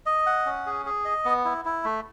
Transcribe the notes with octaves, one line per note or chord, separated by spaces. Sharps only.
D#5
F#5
C#4
G#4
G#4
D#5
B3
E4
E4
A3